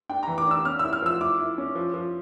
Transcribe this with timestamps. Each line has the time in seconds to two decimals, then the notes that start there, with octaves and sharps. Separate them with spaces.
0.09 D4 G5
0.23 E3 A#5
0.38 D6
0.47 D4 E6
0.65 C#4 F6
0.79 E4 E6
0.93 F6
1.02 F3 E6
1.21 E4 D6
1.39 E4
1.58 C#4
1.75 F3
1.94 F3